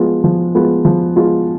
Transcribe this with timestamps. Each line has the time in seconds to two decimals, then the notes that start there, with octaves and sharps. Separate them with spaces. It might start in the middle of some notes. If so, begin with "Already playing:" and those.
Already playing: F3 G#3 B3 F4
0.24 F3
0.55 G#3 B3 F4
0.85 F3
1.16 G#3 B3 F4